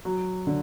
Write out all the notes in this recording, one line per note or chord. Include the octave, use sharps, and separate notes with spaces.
F#3
D3